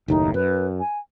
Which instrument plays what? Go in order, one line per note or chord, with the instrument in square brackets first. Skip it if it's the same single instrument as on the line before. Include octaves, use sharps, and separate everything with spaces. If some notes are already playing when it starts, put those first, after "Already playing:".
[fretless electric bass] F#1 D#2 A2 [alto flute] D#4
[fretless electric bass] F#2 [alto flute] B4
[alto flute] G#5